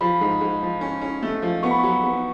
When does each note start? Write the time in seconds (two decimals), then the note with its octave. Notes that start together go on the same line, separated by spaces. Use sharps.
0.01 F3 B5
0.21 G#2
0.41 G#2
0.62 F3
0.81 C#4
1.02 C#4
1.23 A3
1.42 F3
1.63 B3 C#6
1.71 B5
1.79 F#3 C#6
2.04 B3